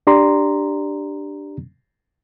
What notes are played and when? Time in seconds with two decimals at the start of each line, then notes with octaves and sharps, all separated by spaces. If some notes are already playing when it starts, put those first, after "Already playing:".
0.07 D4 G4 D5 A#5 C6